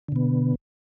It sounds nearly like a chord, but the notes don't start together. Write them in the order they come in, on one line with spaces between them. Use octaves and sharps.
D3 B2 B3